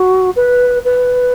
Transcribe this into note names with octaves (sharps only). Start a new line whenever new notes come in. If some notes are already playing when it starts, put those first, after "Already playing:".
Already playing: F#4
B4
B4